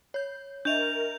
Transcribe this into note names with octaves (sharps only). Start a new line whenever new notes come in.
C#5 G6
D4 A#4 D#5 E5 G6 F7